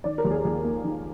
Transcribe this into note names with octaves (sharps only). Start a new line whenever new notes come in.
D#3 D5
A#4
D#2
G#4
D#2 G#4
A#3
D#3